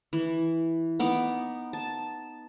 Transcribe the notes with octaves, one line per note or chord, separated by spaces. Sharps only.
E3
B3 D#4 D6
A5